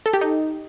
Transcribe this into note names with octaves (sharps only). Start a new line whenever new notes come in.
A4
G4
D#4